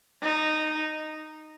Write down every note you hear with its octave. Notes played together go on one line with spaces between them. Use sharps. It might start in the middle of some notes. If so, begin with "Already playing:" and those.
D#4